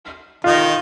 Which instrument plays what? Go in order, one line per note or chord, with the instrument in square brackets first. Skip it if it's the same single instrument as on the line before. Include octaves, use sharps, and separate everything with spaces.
[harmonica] D#3 D#4 [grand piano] F4